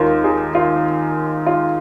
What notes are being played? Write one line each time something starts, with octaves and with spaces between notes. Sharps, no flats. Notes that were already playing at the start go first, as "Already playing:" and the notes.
Already playing: D#2 D#3 F4 A#4
D#4 G#4
F4
F4